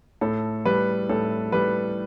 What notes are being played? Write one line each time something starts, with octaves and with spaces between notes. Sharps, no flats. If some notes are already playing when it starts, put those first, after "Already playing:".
A2 A4
G3 B4
A2 A4
G3 B4